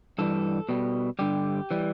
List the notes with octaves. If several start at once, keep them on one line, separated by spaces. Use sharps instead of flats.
G2 E3 G3 A4
B2 G3
G2 D3 G3 G4
E3 G3